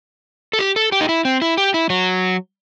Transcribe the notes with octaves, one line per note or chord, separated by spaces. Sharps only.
A4
G4
A4
G4
D#4
E4
C4
E4
G4
E4
F#3